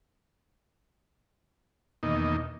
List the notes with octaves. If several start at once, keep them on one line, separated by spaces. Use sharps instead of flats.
E2 B2 D#3 A#3 D#4